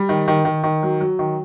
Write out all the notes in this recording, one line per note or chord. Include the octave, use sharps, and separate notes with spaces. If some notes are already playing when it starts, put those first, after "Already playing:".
Already playing: G3
D#3
D#3
D#3
D#3
F#3
F#3
D#3